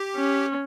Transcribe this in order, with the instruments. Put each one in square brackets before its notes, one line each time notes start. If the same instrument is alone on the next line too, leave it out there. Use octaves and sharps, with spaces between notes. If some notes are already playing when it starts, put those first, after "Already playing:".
Already playing: [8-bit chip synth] G4
[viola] C#4